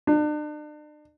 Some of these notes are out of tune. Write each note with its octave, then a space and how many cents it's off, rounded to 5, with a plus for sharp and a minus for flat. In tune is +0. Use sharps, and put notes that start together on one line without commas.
D4 +40